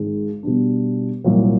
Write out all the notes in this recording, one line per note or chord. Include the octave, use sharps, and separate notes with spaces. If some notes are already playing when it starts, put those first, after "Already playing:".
Already playing: G#1 G#2 D#3 G#3
B2 G3 B3 D4
C2 A#2 F#3